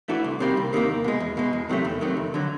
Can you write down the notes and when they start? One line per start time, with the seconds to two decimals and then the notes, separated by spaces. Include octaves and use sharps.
0.08 E3 A3 D4 F#4
0.24 C2
0.40 C3 D#3 G3 A#3
0.57 C2
0.73 C3 D#3 G3 A#3
0.89 E2
1.04 B2 G#3
1.20 E2
1.37 B2 G#3
1.53 E2
1.69 C3 D#3 F#3 A3
1.85 E2
2.01 C3 D#3 F#3 A3
2.17 F2
2.34 D3 F#3